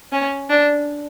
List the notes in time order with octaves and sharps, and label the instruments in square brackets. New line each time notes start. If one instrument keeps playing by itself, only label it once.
[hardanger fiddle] C#4
D4